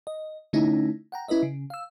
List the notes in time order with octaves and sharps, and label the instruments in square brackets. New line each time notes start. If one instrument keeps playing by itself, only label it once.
[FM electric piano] D#5
D3 A3 C#4 D#4 E4
F#5 G5 A#5
C#4 E4 B4 D#5 E5
C#3
F5 E6